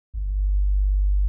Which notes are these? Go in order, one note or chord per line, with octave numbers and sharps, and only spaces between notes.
G1